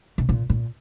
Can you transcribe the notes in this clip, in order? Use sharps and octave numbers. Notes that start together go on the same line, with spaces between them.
B2
A#2
A#2